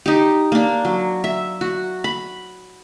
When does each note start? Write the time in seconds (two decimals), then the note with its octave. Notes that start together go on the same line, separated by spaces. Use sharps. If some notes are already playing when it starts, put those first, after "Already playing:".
0.06 D#4 G4
0.52 A#3 D4
0.85 F#3
1.24 E5
1.61 F#4
2.04 B5